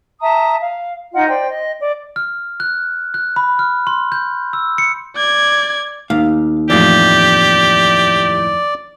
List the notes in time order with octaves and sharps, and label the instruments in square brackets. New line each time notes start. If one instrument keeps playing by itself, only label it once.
[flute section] E5 A5 A#5 D#6
F5
D#4 F4 D#5 F#5
C5 D5 G5
D#5
D5
[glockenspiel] F6
F#6
F#6
B5
F6
C6
G6
E6
C#7
[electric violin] D5 G#6
[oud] D#2 [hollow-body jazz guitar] F5
[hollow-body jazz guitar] F2 A2 E3 [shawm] G4 [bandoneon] D5